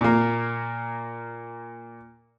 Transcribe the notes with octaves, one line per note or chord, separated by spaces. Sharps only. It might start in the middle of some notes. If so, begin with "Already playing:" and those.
A#2 A#3